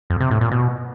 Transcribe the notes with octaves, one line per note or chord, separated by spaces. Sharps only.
F2
C3
A2
A#2
B2